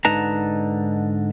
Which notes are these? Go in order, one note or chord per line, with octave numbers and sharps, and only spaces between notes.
G#2 D3 D#4 B4 A5 A#5